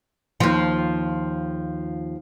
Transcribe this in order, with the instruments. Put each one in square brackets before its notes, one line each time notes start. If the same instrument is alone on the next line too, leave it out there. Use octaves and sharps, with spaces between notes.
[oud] D#2 F3